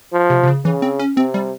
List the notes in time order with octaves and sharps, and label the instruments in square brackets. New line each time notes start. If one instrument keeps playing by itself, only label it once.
[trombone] F3
[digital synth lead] C3
C3
C#3
[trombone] C#3 [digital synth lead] E3
[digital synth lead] C4
C#4
[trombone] C3 [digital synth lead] C4
[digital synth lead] G3